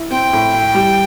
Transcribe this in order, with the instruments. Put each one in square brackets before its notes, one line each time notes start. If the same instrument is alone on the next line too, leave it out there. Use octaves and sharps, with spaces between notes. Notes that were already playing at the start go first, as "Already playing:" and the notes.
Already playing: [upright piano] E4
[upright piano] C4 [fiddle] G5
[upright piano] A2
E4
G3